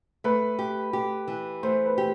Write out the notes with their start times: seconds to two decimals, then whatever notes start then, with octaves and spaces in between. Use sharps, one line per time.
0.24 A3 B4
0.59 G4
0.93 G4
1.27 E3
1.63 A3 C5
1.86 B4
1.98 G4